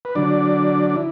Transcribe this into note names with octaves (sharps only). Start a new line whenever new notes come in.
B4
D3 F#3 D4 D5
D5
E4